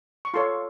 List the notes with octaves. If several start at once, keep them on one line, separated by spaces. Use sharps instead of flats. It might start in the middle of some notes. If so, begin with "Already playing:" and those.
C#6
F4 A4 C#5 C6